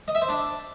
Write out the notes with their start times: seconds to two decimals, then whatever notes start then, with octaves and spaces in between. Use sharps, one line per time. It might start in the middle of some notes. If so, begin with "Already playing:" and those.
0.08 D#5
0.15 E5
0.22 C5
0.29 D4